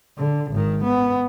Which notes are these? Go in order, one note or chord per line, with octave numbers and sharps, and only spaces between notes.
D3
G#1 D#3
B3